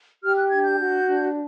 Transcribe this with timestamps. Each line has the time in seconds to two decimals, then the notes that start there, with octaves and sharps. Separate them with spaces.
0.23 G4 F6
0.37 F#6
0.50 D4 G#6
0.64 G6
0.79 F#4
1.05 D4